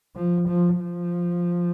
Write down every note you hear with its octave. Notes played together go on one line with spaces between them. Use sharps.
F3
F3
F3